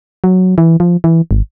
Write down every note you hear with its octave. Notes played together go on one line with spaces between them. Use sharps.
F#3
E3
F3
E3
G#1